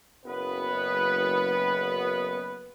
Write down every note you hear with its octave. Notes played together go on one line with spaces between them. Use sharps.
F#1 B3 B4